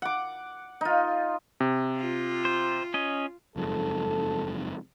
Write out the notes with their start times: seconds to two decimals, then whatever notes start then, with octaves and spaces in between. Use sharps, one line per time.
0.02 F#5 D6
0.81 D#4 F4
1.60 C3
1.97 F4
2.45 C5
2.94 C#4 D#5
3.56 F#1 F2 G#2 A4